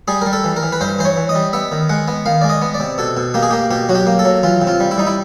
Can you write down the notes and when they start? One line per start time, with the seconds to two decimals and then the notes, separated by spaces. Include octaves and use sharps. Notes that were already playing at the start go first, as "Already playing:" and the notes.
0.08 G3 G#4
0.21 G3 A#4
0.33 A4
0.44 E3
0.56 A#4
0.63 E3
0.72 B4
0.81 G2 C5
0.99 E3 C5
1.05 C#5
1.17 E3
1.29 D#5
1.35 G3
1.53 B3 E5
1.72 D#3
1.89 G#3 F#5
2.08 B3
2.26 D#3 F5
2.41 G#3 D5
2.50 D#5
2.62 B3
2.74 D5
2.80 C3
2.98 B2 A4
3.17 B2
3.34 A#3 G4
3.43 G#4
3.51 A#3 G4
3.71 B2 G4
3.89 F#3 F#4
3.95 G4
4.07 A#3
4.19 A4
4.25 F#3
4.43 E3 F4
4.62 C3
4.67 F4
4.80 G3
4.91 E4
4.98 G3 D#4
5.07 E4